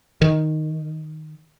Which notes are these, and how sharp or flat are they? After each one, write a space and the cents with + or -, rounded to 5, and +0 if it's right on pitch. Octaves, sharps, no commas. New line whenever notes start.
D#3 +0